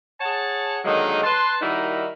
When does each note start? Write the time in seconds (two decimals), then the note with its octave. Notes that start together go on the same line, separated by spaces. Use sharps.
0.21 G#4 C#5 F#5 A5
0.85 D3 D#3 F#3 G#3 A#3 D#4
1.24 B4 A5 C6
1.61 D#3 G3 D#4 E4 F#4 A#4